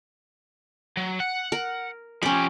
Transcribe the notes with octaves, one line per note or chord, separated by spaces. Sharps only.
F#3
F#5
A#4
F3 C#4 G4 B5